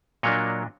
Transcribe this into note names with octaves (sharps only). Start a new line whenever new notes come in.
A#2 F#3 A#3 D4 C#5 D#5